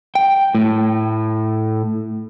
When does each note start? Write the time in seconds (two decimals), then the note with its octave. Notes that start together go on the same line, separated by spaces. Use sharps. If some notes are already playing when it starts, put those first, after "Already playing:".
0.15 G5
0.55 A2